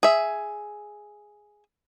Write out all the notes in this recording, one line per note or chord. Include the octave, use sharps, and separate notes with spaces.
G#4 E5